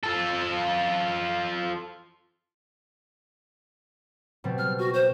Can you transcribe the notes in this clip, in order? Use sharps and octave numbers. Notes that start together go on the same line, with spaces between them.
F4 A4
B2 G3 C4
F6
F#4
C5